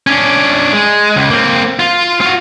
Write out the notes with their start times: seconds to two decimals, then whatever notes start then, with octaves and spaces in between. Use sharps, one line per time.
0.07 C#4 D4
0.73 G#3
1.16 C#2
1.30 A#3 C4
1.79 F4
2.21 F4 F#4